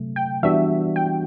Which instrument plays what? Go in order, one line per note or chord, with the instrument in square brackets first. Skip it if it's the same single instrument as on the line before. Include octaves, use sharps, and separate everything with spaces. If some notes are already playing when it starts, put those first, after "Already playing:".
Already playing: [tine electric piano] C3 F#3 A3
[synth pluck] G5
[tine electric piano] E3 G3 B3 D4 F#4 [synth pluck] E5
[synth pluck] G5